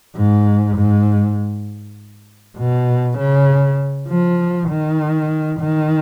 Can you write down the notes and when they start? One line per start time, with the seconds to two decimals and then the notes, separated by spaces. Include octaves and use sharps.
0.16 G#2
0.77 G#2
2.58 B2
3.18 C#3
4.09 F3
4.69 D#3
5.60 D#3